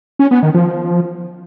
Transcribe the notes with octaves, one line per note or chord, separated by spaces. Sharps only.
C#4
B3
D#3
F3